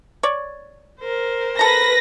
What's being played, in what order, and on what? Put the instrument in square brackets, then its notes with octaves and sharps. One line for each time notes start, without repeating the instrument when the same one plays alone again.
[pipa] C#5 D5
[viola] A#4 C5
[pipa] A4 A#5 [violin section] B4 A#6